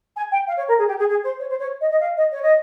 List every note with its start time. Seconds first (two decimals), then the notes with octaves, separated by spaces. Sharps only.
0.16 G#5
0.31 G5
0.47 F5
0.57 C#5
0.68 A#4
0.78 G#4
0.87 G4
0.98 G#4
1.09 G#4
1.23 C5
1.39 C#5
1.49 C5
1.59 C#5
1.80 D#5
1.90 D#5
2.00 F5
2.16 D#5
2.31 C#5
2.42 D#5